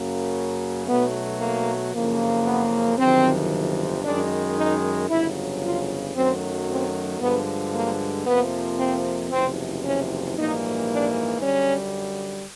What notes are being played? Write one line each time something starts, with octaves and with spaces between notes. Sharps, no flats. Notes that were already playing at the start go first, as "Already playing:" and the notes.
Already playing: F#2 C#3 F#3 A#3
B1 B2 F#3 A3 B3
A#3
F#1 F2 C#3 F3 A#3
B3
G1 F2 C3 D#3 F#3 C4
F#2 D#3 G#3 D4
D#4
G1 F2 C#3 F#3 E4
F4
F#2 D#3 F#3 A3 C4
C4
G2 D3 F3 G#3 B3
A#3
F2 C3 F3 A#3 B3
C4
F#1 E2 C3 F3 C4
C#4
A#1 G#2 E3 G3 A#3 D#4
D4
F#2 D3 G3 C#4